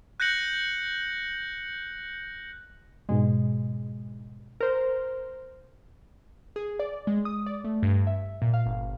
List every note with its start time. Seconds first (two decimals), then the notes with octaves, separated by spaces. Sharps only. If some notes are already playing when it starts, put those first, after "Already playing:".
0.20 F#6 G6 A#6 C#7 F#7
3.09 G#2 B2 G#3
4.61 A#4 C5
6.56 G#4
6.79 D5
7.07 G#3
7.25 D#6
7.46 D5
7.64 A3
7.83 G2
8.07 E5
8.42 A#2
8.54 F5
8.66 G1